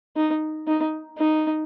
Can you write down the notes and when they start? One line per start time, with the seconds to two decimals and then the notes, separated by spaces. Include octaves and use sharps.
0.17 D#4
0.68 D#4
1.18 D#4